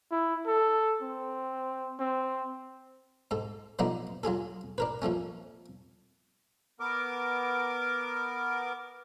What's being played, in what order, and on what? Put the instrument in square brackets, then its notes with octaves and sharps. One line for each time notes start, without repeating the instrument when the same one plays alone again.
[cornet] E4
A4
C4
C4
[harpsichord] G#2 A4
F3 F#3 A3 B3 D4 D#4
F#3 F4 G#4 A4
D4 A#4 B4
A#2 F3 A3 C#4
[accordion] B3 A#4 D6